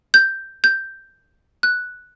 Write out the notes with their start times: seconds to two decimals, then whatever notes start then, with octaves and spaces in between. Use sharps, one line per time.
0.14 G6
0.64 G6
1.63 F#6